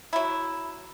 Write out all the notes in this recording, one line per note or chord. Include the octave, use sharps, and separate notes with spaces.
F#3 E4